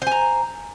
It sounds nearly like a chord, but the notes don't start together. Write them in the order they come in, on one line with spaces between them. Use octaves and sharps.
C5 G#5 A#5